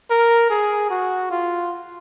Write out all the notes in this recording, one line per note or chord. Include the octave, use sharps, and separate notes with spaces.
A#4
G#4
F#4
F4